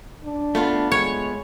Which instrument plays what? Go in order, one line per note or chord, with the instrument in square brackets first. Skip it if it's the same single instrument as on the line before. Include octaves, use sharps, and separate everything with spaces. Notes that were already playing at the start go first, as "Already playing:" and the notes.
[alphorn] D4
[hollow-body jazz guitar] A3 B3 F4
[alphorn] G#3 [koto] C#5